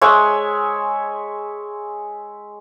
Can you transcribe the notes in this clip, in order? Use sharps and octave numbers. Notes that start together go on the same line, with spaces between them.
G#3 C#5 E5 G#5